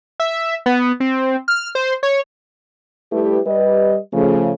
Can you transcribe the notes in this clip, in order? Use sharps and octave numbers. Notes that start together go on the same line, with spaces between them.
E5
B3
C4
F6
C5
C#5
G3 A3 E4 G4 B4
G3 B4 D#5
C#3 F3 A3